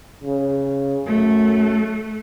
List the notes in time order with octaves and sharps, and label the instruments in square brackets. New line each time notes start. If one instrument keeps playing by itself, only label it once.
[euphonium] C#3
[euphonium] F#2 [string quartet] A3